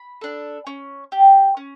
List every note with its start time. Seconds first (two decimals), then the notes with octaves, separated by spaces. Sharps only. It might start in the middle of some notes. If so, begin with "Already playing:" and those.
Already playing: B5
0.21 D4 A4
0.67 C#4
1.12 G4
1.57 C#4